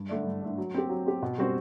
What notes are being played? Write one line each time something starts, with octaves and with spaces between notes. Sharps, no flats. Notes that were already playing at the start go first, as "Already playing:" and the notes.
Already playing: G2
D3 A3 D4
G2
D3 A3 D4
F#3
C4 G4
F#3
C4 G4
B2
G3 C4 F#4 C5